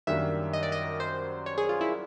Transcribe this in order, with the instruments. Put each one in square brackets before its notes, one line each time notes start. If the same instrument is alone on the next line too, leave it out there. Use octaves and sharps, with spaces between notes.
[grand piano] F#2 D#3 G3 A#3 D4 [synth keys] E5
[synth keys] D#5
D5
D#5
C5
C#5
G#4
F4
E4